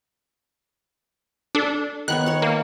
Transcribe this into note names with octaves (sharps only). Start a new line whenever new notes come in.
D4 A4
D#3 B3 C#5 F#6
C#5 F#5
A#3